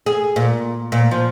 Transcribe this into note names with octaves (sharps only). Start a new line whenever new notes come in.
G#4
A#2
A#2
F3